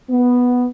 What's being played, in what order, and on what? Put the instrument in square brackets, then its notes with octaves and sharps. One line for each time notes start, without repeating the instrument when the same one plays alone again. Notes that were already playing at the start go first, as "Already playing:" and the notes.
[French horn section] B3